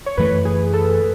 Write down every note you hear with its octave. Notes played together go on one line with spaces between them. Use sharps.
C#5
F#2 E3 A3 B4
G#4
A4